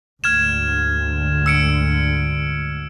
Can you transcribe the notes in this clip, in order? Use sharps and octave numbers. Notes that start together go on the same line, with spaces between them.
D2 G#2 D3 F6 G#6 E7
E6 C#7 D7